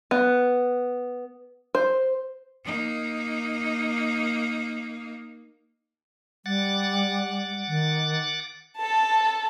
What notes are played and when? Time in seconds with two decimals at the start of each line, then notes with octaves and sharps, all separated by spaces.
0.11 B3
1.75 C5
2.64 A#3 D#4
6.46 G3 F#5 D6 A6
7.68 D#3
8.77 A4 A5